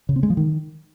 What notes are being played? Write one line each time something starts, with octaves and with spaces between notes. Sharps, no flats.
C#3
C4
G#3
F3
D#3